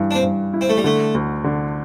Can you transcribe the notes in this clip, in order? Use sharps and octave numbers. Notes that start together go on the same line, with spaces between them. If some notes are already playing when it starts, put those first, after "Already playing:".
Already playing: G2 E3
D4
C4
G2
E4
C4
A3
G3
D3 A3
D2
D3